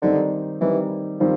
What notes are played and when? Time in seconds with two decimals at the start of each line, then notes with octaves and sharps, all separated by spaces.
0.02 D3 D#3 G3 C4 D#4
0.61 D#3 E3 G3 C4 D#4
1.20 D#3 F3 G3 C4